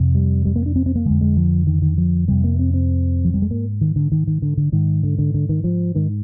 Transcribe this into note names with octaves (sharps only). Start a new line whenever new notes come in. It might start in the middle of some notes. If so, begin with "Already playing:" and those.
Already playing: F2 C3
G3
G3
A#3
D4
C4
C4
A#3
F2 D3 G#3
G#3
F3
D#3
D#3
F3
F2 C3 G3
A#3
C4
C4
F3
G3
G#3
G#2 A#3
D#3
D3
D#3
D#3
D3
D3
G#2 D#3
D3
D3
D3
D#3
F3
G#2 D#3